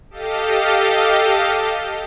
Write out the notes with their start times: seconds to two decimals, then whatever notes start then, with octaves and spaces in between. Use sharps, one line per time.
0.10 G4 A4 D#5 F5